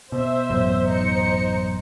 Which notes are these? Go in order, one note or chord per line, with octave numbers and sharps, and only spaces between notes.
B2 C5 E5
A1 F#2 B2
D#4 C5 C#7